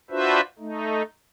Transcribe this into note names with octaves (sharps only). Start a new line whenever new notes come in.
D4 F4 F#4 B4 C5 E5
A3 D#4